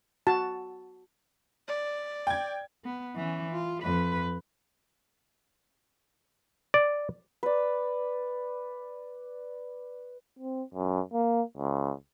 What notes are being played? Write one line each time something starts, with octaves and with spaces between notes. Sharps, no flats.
F#4 A5
D5
G5 G#6
B3
E3 C#4
F4
F2 B4
D5
B4 D5
C4
F#2
A#3
C#2